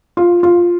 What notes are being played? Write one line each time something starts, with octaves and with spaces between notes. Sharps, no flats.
F4
F4